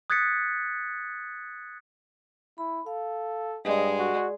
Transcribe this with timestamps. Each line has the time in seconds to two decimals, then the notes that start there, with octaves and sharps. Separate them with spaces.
0.10 D#6 F#6 G#6 A6 B6 C#7
2.58 E4 B5
2.86 A4 F5
3.65 G2 G#3 G#4 D5 D#5
3.99 F#4